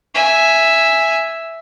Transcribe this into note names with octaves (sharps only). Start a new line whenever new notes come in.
E5 G#5